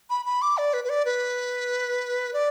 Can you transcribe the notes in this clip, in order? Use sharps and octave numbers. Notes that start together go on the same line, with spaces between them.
B5
B5
D6
D5
B4
B4
D5
B4
D5